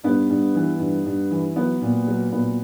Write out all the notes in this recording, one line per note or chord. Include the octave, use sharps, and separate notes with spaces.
G2 B3
G2
E3
G2
G2
E3
F#3 B3
A#2
F#3
A#2 B3